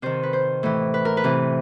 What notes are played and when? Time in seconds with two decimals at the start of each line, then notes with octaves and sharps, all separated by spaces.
0.02 C3 D#3 C5
0.23 B4
0.33 C5
0.63 A2 E3
0.94 B4
1.05 A#4
1.17 B4
1.24 C3 E3